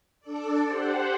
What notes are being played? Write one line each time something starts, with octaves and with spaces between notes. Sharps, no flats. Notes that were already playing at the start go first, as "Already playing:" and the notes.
D4 A4 D5
G4 C5 F#5